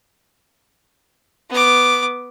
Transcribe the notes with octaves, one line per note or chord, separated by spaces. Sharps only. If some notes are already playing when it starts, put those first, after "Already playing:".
B3 D6